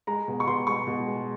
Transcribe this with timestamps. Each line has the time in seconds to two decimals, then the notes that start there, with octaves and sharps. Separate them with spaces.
0.07 G#3 A#5
0.28 B2
0.40 C#6
0.47 B2 C6
0.67 G#3 C#6
0.87 B2
1.07 G#3